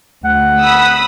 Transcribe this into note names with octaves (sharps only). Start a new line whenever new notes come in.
D2 F#5
B5 D#6 E6